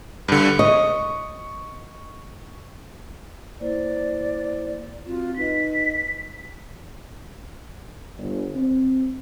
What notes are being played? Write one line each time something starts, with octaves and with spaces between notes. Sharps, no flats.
G2 D3
D#5 C#6
A#3 E4 C5 D5
C4 F4 F#4
D#4 B4 D#5 B6
G1
C4